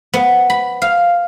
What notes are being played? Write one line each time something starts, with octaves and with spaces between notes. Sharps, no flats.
B3
B5
F5